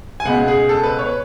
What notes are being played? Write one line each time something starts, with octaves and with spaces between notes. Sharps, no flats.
G#5
C#2 B2 G#3 B3 F#5
G#4
A4
B4
C#5
B4